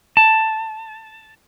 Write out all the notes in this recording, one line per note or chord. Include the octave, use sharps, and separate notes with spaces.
A5